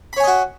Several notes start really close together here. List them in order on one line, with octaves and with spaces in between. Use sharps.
B5 C#5 G#5 D#5 F#4